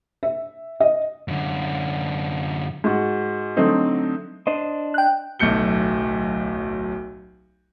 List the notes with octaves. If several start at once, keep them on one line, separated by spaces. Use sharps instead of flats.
E5
D#5
F#2 D3
G#2 F#4
D3 F#3 A3 C4 D#4
D4 C5 D#5
G5 F#6
D1 B1 A3 G6 C#7 G7